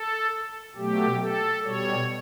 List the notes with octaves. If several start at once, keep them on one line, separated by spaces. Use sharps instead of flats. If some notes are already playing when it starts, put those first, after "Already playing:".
Already playing: A4
B2 F#3 A3 G4
A4
B2 G3 C#5